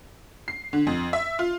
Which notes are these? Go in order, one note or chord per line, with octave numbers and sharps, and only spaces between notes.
C7
D3
F2
E5
F4